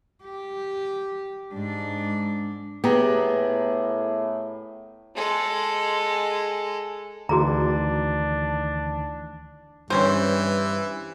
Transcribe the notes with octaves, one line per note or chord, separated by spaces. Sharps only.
G4
G#2 D4
A2 B3 G4 G#4 A#5
G#3 A4
D2 D#3 E3 D4 F#4 G#4 A#5
G2 E3 C4 C#4 A#4 C5